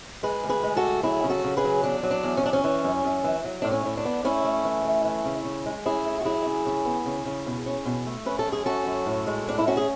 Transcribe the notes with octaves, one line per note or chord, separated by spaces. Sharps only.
G#3 G#4 B4
D2
G#4 B4
G#3
F#4 A4
D2
F#3 E4 G#4
C#3
F#4 A4
C#3
G#4 B4
F#3
E2 D4
F#3
D4
E2
C#4
F#3 D4
C#4
E3
F#2
F#2
E3
F#3
A2 D4
C#4
A2
D4
B3
A3 C#4 E4
A3
E3
A3
E3
C#3
C#3
G#3
C#4 E4 G#4
A3
F#4
F#3 E4 G#4
C#3
C#3
B3
C#3
C#3
B2
C#4
B2
A3
C#4 B4
A4
F#2
G#4
C#4 F#4 A4
F#2
A2
G#3
A2 D4
E4
C#4 F#4
G#4